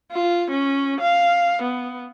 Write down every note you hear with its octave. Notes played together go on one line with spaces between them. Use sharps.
F4
C#4
F5
B3